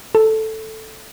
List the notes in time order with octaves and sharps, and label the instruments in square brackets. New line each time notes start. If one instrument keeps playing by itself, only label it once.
[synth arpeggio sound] A4